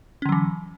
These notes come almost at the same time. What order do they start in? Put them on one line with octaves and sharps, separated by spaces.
C#4 D3 F#3 E3